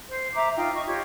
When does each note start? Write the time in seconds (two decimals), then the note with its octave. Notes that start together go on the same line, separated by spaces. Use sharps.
0.09 C5
0.34 E5 A#5 D6
0.56 D#4 F4 G5
0.74 D#5 C#6
0.87 F4 G4 C#5